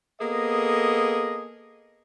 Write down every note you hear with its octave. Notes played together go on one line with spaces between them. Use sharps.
A#3 B3 G#4 A4 D#5